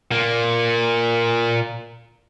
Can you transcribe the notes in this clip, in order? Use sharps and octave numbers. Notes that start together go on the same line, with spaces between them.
A#2 A#3